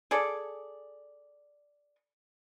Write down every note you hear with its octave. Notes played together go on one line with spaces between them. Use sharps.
G#4 A4 D5